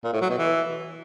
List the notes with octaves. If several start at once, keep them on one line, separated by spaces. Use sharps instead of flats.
A#2
A2
F#3
B2
E3